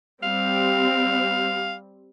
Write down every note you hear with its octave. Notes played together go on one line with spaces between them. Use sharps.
G3 C4 F5